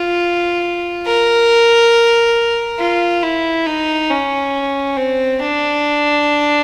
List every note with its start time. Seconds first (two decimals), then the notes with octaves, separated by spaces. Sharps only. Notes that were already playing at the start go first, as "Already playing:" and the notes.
Already playing: F4
1.06 A#4
2.80 F4
3.23 E4
3.66 D#4
4.09 C#4
4.96 C4
5.39 D4